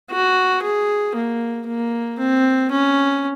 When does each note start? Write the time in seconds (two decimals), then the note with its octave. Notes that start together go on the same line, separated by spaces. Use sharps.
0.11 F#4
0.63 G#4
1.15 A#3
1.67 A#3
2.18 C4
2.71 C#4